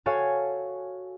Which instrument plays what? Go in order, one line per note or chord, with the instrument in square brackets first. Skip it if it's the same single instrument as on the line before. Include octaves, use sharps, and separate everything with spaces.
[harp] F#4 A4 C#5 F5 G#5